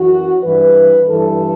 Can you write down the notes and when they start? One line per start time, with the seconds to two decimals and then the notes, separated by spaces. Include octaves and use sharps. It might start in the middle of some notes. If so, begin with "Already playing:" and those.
Already playing: F#2 E3 F#4
0.42 G2 E3 B4
1.06 G2 E3 A4